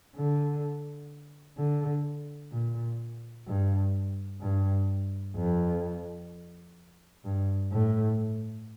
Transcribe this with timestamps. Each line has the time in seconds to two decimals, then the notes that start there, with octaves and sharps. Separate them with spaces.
0.16 D3
1.58 D3
2.51 A#2
3.47 G2
4.41 G2
5.36 F2
7.25 G2
7.72 A2